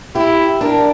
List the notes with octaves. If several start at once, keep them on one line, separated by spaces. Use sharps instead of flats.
E4 G4
D4 A#4